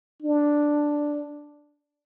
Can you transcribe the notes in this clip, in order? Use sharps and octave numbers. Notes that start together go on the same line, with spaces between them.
D4